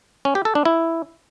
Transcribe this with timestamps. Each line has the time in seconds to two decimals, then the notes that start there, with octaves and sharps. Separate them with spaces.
0.25 C#4
0.35 G4
0.45 A4
0.55 D4
0.65 E4